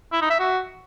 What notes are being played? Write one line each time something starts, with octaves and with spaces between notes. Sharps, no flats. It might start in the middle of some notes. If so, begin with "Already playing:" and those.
E4
D#4
E5
F#4